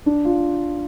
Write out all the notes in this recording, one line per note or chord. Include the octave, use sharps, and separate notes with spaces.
D4
F4